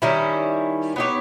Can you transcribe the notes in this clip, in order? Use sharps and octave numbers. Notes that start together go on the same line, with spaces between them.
D#3 G3 C#4 E4
B3 D#4 G4 C#5